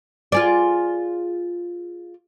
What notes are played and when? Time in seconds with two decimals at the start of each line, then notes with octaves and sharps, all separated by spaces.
0.32 F4 G#4 D5